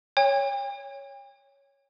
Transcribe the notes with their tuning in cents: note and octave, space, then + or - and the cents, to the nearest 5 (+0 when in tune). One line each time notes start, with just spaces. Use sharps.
C#5 +0 G5 +45